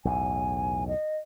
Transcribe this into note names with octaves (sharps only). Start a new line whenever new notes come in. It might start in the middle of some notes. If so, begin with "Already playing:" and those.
B1 E2 A2 G#5
D#5